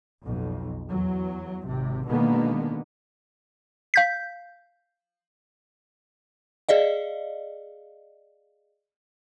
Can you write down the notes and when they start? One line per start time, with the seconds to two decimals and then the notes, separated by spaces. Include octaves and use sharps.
0.23 B1 F2
0.89 E2 F#3
1.67 G#1 C3
2.07 B2 D3 D#3 G#3 A#3 B3
3.94 F5 G6 B6
6.69 G#4 D5 D#5 F5